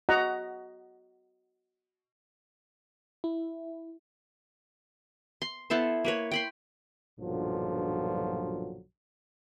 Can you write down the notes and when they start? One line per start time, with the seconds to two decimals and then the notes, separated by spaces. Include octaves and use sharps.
0.09 F#4 D#5 F#5 A#5
3.24 E4
5.42 C6
5.70 B3 E4 A4 C5
6.05 A#3 B4 C#5
6.31 G5 B5 C6
7.19 B1 G2 A#2 D3 F3 F#3